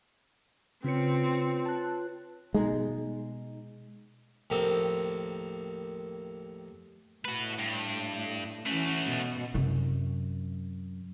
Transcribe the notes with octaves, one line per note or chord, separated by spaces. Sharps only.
C#3 C4 F4 B4 C#5 C#7
A5 F#6
B2 G#3 D#4
D#2 A2 F3 A#3 C4
A2 F#4 B4
G2
E3 A3 C#4 F#4
B2
F#2 C3